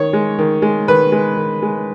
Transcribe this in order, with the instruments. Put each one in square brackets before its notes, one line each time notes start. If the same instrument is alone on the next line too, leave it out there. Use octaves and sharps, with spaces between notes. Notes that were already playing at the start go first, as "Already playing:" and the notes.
Already playing: [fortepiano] D#3 C#5
G#3
D#3
G#3
D#3 B4
G#3
D#3
G#3